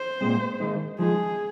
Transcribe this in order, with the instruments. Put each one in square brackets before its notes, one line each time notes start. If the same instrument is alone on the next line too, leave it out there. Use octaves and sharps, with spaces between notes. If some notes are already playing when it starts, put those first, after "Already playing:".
Already playing: [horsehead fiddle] C5
[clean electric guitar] A#2 G#3 C4
D#3 G#3 D#4
[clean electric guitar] F3 G#3 D#4 [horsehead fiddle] G#4